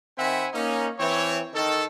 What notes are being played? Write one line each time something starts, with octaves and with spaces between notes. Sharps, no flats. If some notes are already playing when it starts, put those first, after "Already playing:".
D#3 C4 E5 F#5 G#5 B5
A#3 C#4 D#4
E3 C4 C#5
D#3 A4